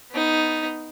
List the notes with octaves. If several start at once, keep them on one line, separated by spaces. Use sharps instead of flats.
B3 D#4